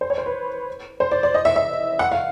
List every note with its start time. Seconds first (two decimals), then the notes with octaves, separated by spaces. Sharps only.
0.01 C5
0.10 C#5
0.18 C5
0.26 B4
1.00 C5
1.12 D5
1.23 D5
1.34 D#5
1.45 E5
1.56 E5
1.99 F#5
2.12 F5